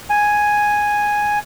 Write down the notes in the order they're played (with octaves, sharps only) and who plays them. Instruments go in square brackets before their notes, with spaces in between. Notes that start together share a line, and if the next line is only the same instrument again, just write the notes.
[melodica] G#5